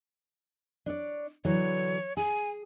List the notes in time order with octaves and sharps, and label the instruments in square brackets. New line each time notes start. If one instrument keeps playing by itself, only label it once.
[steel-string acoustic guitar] D4 C#5 D5
[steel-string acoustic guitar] D3 E3 F#3 [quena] C#5
[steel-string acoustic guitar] G#4 [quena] G#5